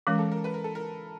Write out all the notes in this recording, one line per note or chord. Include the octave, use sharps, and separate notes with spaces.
E3 G#3 C#4 A#4
A4
A#4
B4
A#4
A4
A#4